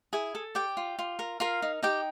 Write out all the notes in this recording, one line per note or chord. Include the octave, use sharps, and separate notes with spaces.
E4 G#4 G#5
A4
G4 D5 G5
F4
F4
A#4
F4 A#4 F5
D#4
D#4 G4 G5